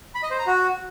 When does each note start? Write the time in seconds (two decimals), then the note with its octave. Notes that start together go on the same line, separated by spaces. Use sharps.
0.15 B5
0.23 D#5
0.31 C5
0.39 A#5
0.47 F#4